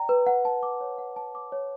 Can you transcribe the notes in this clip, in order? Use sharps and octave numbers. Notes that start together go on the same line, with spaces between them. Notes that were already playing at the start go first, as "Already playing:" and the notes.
Already playing: D5 G5 A#5
B4
F#5
A5
D6
C#5
F#5
A5
D6
C#5